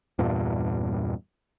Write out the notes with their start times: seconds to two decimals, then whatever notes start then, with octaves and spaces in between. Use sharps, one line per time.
0.19 E2 G2 A#2